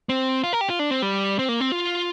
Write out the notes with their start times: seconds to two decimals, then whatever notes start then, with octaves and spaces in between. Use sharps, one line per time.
0.09 C4
0.44 F4
0.53 A#4
0.61 G4
0.70 F4
0.79 D4
0.91 C4
1.02 G3
1.39 C4
1.49 A#3
1.60 C4
1.72 F4